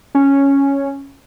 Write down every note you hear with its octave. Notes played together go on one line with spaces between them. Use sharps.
C#4